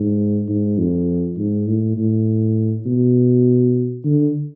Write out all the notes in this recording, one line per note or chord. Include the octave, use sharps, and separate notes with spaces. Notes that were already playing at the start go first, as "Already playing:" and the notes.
Already playing: G#2
G#2
F2
G#2
A2
A2
B2
D3